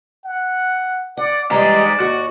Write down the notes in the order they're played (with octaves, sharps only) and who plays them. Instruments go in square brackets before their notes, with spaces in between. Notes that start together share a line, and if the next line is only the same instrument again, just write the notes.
[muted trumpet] F#5
[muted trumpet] D5 [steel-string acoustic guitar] F#5
[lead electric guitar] G#2 A#5 [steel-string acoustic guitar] E3 G3 G#3 [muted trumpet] D5
[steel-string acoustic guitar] D#2 [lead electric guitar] F#4